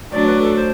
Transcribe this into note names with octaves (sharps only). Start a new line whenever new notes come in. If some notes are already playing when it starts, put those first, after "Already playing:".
F#3 A3 D4 D5
B4
A4
C5